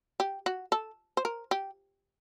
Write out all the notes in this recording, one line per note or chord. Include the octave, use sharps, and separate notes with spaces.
G4
F#4
A4
C5
A#4
G4